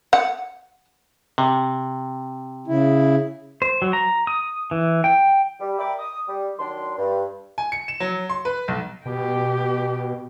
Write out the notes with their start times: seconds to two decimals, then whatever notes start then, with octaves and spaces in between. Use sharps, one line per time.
0.13 F#5
1.38 C3
2.67 C#3 E4
3.62 C5
3.82 F#3
3.93 A#5
4.27 D#6
4.71 E3
5.04 G5
5.60 G3
5.79 A#4 D5 E5 G5 B5 D6
5.99 D#6
6.28 G3
6.59 D#3 F#3 D4 C6
6.98 G2
7.58 G#5
7.72 C#7
7.88 E7
8.00 F#3
8.29 C6
8.45 B4
8.68 B1
9.06 B2 G4